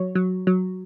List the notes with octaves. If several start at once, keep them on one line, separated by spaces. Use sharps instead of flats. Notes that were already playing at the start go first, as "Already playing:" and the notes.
Already playing: F#3 C#5
F#3
F#3